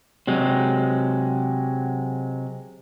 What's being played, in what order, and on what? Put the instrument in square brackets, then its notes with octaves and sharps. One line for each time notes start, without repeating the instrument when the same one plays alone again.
[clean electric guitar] C3 F#3 G#3